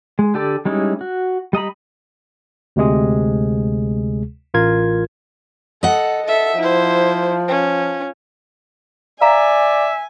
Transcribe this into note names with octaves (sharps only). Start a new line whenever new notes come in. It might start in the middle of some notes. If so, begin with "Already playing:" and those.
G#3
D3 G4 A4 D5
G3 G#3 C#4 D#4 E4
F#4
G3 D#5 A#5 B5
D2 C3 G#3 G#4
A1 F4 A#4 G#6
A4 D#5 F#5
A4 E5
F3 E4 C5
C#4
D5 E5 F5 G#5 A#5